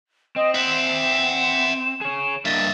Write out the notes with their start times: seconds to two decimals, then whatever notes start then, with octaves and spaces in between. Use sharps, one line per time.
0.36 C4 D#5
0.55 E5 F#5 E7
2.01 G#4 C#5
2.46 G2 A#3 D#5 E5 A6